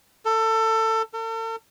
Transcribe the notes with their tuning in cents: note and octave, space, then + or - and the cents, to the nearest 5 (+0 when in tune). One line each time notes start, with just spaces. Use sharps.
A4 +25
A4 +45